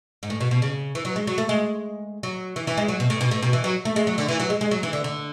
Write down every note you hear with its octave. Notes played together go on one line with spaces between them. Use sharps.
G#2
A2
B2
B2
C#3
E3
F#3
G#3
F#3
A3
G#3
F#3
E3
E3
G#3
F#3
B2
A2
B2
A2
B2
E3
F#3
A3
G#3
F#3
D3
E3
F#3
G#3
G#3
F#3
E3
D3
D3